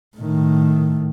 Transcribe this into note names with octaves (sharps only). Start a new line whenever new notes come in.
A2 D#3